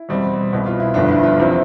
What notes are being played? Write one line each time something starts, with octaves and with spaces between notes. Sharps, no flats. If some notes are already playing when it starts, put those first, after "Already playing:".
Already playing: E4
E2 B2 G3 C4
C2 B2 B3
F4
E4
G1 G2 F3 B3 D4
E4
F4
E2 C3 F3 C4